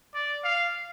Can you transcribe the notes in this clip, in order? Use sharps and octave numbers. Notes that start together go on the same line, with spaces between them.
D5
F5